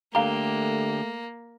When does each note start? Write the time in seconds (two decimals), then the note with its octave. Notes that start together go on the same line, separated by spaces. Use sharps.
0.15 D3 A3 A#3 G4 F5 A#5